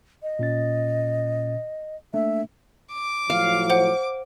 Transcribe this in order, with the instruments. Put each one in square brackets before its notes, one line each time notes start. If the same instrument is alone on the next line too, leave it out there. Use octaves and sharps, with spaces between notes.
[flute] D#5
[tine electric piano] A#2 C#4 A6
[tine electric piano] A3 A#3 D4 [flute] E5
[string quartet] D6
[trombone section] A2 F3 F#3 [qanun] F5
[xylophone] C5 F#5